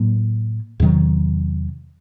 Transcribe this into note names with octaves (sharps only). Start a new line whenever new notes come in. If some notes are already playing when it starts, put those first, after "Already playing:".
Already playing: A2 F#3 A#3
E2 C3 D#3 F#3